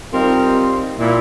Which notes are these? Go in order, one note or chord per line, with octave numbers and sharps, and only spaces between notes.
G3 C4 D#4 F4 G4 A#4
A#2 E4